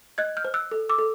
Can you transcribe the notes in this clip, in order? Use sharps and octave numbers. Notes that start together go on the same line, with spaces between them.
D#5 F#6 G#6
F6 G6
C5
E6 F#6
A4
D6 E6
A4